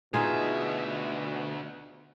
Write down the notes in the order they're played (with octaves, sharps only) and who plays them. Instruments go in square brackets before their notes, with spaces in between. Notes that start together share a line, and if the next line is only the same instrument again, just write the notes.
[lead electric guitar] D2 E5 [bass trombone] B2 [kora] D#4 F4 G#4